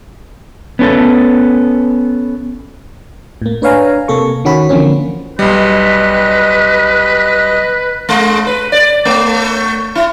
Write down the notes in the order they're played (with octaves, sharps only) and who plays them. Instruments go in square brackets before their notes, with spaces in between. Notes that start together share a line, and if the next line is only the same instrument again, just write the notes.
[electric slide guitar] B3 C#4 G4 A4
[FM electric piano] A2 A#3
D4 B4 C#5 F5 G#5 A#5
C3 A#3 A4 C#6
D#3 C#4 F#4 B5
D3 E3 F3 A#3 C4 C#4
[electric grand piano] B1 G3 [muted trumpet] B4 [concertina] D#5
[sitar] G#3
B4
D5
A3
E4